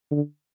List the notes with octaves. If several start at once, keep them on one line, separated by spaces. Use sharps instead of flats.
D3